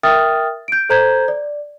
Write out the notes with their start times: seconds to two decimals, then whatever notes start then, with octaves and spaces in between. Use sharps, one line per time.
0.03 A#4 E5 G5 D#6 F6 A6
0.68 G6 D7
0.89 A4 C5 A#5 G6 G#6
1.28 D5